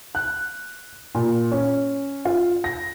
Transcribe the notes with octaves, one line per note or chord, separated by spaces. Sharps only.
F#6
A#2
C#4
F4
A#6